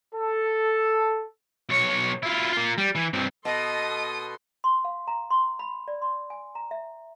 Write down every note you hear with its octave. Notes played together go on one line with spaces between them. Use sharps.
A4
B1 C#5
E4 F4
A#3 F4
G3
E3
G2 C4
B2 A4 D#5 C6 D#6
C6
F5
A#5
C6
B5
D5
C6
G#5
A#5
E5